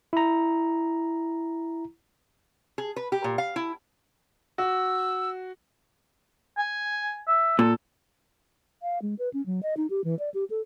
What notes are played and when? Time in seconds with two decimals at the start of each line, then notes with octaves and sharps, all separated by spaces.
0.13 E4 A#5
2.78 G#4
2.96 B4
3.12 G4
3.24 A#2
3.38 F5
3.56 E4
4.58 F#4 E6
6.58 G#5
7.27 E5
7.59 A#2 A4
8.82 F5
9.02 G#3
9.19 B4
9.33 C#4
9.46 F#3
9.63 D#5
9.77 D#4
9.90 G4
10.04 E3
10.19 D5
10.34 G4
10.50 A4